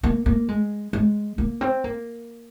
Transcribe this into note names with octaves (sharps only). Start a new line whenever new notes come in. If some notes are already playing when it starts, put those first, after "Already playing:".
A#3
A#3
G#3
G#3
A#3
C4
A#3